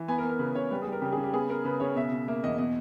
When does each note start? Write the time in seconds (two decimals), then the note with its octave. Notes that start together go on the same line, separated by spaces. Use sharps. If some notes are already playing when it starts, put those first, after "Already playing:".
Already playing: E3
0.08 B3 G#5
0.18 A#4
0.23 B3
0.29 A#4
0.39 C#3 B4
0.55 C#3 C#5
0.71 G3 B4
0.82 G#4
0.87 G3
0.92 A#4
1.02 C#3 G4
1.12 G#4
1.17 C#3
1.24 G4
1.33 B3 G#4
1.49 B3 A#4
1.64 C#3 B4
1.80 C#3 C#5
1.96 B2 E5
2.12 B2
2.28 A#3 E5
2.43 E2 D#5
2.58 B2 D#5